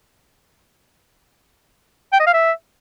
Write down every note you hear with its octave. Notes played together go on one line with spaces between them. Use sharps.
G5
D#5
F5
E5